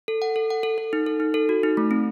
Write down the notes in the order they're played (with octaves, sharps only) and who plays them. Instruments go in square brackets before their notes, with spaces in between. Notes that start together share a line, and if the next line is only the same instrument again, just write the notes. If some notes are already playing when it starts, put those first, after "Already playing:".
[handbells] A4
F#5
A4
F#5
A4
A4
D#4
A4
D#4
A4
F#4
D#4
A3
C4